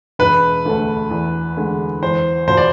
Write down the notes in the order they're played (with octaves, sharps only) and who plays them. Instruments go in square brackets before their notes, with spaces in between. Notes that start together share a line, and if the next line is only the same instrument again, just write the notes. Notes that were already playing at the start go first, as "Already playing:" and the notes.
[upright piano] E1 [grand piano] B4
[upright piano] D2 D3 A3
E2
D3 G#3
[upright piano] E2 [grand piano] C5
[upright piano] B2 B3 F4 [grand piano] C5
[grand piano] D5